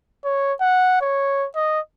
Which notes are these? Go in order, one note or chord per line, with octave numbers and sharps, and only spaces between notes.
C#5
F#5
C#5
D#5